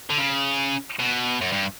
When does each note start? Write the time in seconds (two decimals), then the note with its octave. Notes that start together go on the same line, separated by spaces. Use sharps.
0.10 D3
0.18 C#3
1.00 B2
1.41 F#2
1.52 G2